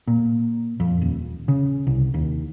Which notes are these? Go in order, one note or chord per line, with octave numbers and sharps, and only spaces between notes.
A#2
F2
D#1
C#3
C2
D#2